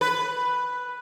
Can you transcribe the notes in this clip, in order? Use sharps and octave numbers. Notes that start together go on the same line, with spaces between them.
B4